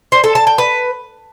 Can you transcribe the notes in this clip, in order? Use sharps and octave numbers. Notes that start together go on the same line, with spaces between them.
C5
A4
A5
G5
B4